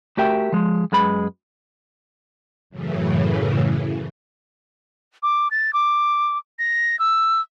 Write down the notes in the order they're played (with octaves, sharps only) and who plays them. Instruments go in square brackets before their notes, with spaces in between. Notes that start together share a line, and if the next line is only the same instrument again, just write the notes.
[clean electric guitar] A3 F#4 G4 A#4 E5 G5
F3 G#3
F#2 G#3 B4 B5
[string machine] F#2 A2 C#3 E3
[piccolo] D6
A6
D6
A#6
E6